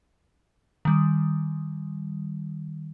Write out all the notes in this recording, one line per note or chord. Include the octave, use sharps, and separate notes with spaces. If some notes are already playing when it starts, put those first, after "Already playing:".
D#3 G3